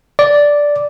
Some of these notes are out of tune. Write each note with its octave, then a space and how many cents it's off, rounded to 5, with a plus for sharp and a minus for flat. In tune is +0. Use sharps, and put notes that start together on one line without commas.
D5 -5